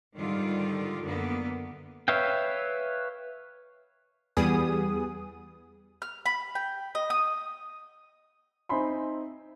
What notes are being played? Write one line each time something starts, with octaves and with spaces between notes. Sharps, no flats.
G#2 D3 D#3 G3 F4
F#2 D3 A#3 B3
B4 C#5 E5 F5 G5
E2 G3 B3 G#4 D#6
F6
B5
G5
D#5
D#6
C4 D#4 E5 G#5 B5 C6